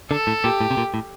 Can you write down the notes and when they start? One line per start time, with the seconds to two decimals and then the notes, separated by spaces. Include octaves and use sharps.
0.11 D3 A4
0.27 A2
0.44 A#2 G4
0.61 A2
0.71 C3
0.77 A#2
0.94 A2